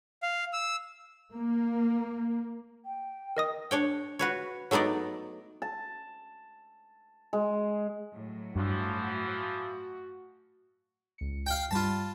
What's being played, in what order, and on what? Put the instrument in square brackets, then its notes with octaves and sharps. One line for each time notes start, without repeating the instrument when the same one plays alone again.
[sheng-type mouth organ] F5
E6
[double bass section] A#3
[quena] G5
[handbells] A#4 D#5 D#6
[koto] D4 C#5 G5
F#4 B4 C#5
F#3 A3 B3 D#4 D5
[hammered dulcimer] A5
G#3
[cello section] A2 F#3
[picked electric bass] G2 [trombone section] E3 F3 [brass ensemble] F#4
[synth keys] C#2 C#7
[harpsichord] F5 G5
[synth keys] G2 G3 B5 [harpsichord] F4 A5